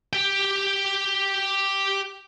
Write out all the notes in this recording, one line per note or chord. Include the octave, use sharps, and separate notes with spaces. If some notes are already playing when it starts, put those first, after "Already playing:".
G4 G5